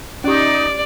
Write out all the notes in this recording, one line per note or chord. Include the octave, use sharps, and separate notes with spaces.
C#4 D#4 G4 D5